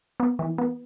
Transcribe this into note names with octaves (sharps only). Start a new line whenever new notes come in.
B3
E3
B3